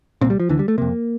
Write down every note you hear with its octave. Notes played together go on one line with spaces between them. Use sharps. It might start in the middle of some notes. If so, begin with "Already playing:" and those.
C2 A#2 C4
G3
F3
D2 D3 E3
G3
A3
F2 C3 A#3